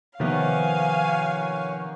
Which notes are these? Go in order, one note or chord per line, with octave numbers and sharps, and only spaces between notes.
C3 D#3 F3 A#3 B3 C#5 F5 G#5